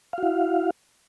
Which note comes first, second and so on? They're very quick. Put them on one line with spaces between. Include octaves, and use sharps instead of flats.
F5 F#4 E4